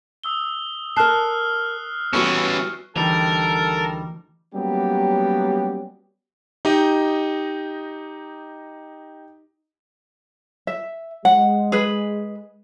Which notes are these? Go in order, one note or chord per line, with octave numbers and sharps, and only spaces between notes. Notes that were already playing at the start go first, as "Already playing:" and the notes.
D#6 E6 G7
A#4 A5 F6 F#6 C7
E3 G3 B3 C#4 F#4 C#6
D2 D#3 E3 G3 A4 A#4
F#3 G3 A#3 B3 C#4 G4
D#4 G4 D#5
E5
G#3 F#5
G#4 B4